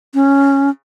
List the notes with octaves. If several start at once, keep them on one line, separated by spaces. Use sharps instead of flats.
C#4